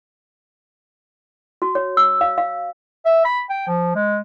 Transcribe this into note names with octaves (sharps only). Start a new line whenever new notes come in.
F#4
C#5
E6
F5
F5
E5
B5
G5
F3
G#3